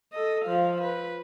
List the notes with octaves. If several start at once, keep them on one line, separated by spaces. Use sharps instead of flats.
A4 D#5
F3 F5
B4